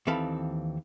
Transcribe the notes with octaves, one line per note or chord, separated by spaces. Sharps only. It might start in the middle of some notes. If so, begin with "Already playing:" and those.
D#2 E3 C4 A4 F5 B5